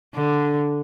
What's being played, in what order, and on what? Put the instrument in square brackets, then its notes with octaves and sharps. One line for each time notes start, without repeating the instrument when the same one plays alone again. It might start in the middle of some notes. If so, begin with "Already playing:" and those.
[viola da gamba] D3